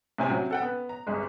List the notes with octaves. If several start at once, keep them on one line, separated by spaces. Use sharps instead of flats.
A2 C3 C5 G#5
F#3 C4
A4 F#5 G5
B3
A#5
G1 C2 G#3